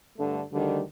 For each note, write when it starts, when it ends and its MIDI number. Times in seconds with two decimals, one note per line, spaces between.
0.17 0.40 43
0.17 0.40 50
0.17 0.40 57
0.52 0.81 38
0.52 0.81 50
0.52 0.81 51
0.52 0.81 55